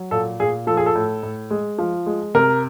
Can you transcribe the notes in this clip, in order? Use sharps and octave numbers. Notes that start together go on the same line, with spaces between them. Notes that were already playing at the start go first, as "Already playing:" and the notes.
Already playing: F#3
A#2 A4
A#2 G#4
F3 A4
G#4
A4
A2
A2
G#3
F3
G#3
C3 A#4